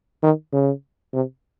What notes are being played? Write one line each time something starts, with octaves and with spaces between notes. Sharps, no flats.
D#3
C#3
C3